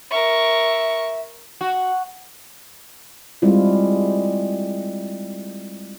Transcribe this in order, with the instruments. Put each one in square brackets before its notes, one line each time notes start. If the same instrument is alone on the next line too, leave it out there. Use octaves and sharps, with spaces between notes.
[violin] A#4 C#6 [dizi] E5
[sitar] F#4
[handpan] G3 G#3 C4 E4 F4